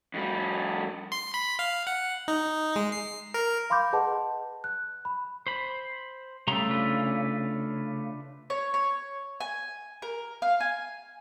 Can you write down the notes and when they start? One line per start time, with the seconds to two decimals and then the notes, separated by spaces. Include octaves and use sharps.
0.14 F2 G3
1.12 C6
1.34 B5
1.59 F5
1.87 F#5
2.28 D#4
2.76 G#3
2.92 C7
3.34 A#4
3.70 F5 B5 C6 D6 G6
3.93 G#4 B4 D#5 F#5 A5
4.64 F#6
5.05 B5
5.47 C5 B5
6.48 C#3 G3 A3 A#5 C6
6.70 D4 F4 B4
8.50 C#5
8.74 C#5
9.40 G#5
10.02 A#4
10.42 F5
10.60 G#5